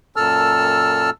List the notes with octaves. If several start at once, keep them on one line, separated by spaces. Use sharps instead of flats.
F#2 A#2 A4 A5 E6 F6